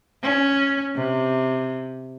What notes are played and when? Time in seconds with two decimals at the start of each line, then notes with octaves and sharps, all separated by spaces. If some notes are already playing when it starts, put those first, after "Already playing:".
0.22 C#4
0.95 C3